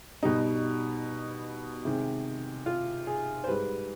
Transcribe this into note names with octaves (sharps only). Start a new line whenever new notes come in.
B2 G3 D#4
C3 D#3 G#3
F4
G#4
C5
G#2 G3 B4